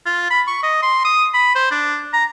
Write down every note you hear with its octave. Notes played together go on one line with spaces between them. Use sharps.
F4
B5
C#6
D#5
C6
D#6
B5
C5
D4
A#5